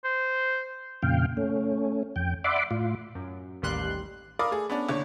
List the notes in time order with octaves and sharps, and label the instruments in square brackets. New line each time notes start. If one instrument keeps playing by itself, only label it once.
[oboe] C5
[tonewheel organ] F2 A#2 C#3 F5 G5
A3 C#4
F2 G5
D5 E5 F#5 B5 C6 D6
A2 F4
[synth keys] F#2
A1 D#2 G3 C6 F#6
[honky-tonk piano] A#4 D5 F5 B5 D6 D#6
A3 G#4
B3 C#4 D4
F#1 D3 C#5